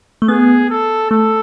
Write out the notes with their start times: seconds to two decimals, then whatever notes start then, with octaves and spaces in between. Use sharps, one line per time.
0.22 A3
0.28 B3 G#4
0.70 A4
1.10 A3 A4